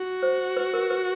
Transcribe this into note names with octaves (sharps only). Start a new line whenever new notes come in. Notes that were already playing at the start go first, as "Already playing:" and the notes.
Already playing: F#4
C5
B4
A#4
B4